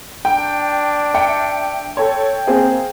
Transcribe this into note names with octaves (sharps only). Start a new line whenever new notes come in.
D4 G5
E5 G5 C#7
A4 C#5 G5
A#3 C4 G#4